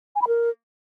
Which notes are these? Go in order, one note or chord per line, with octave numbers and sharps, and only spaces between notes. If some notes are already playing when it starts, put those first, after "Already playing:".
G#5
B5
A#4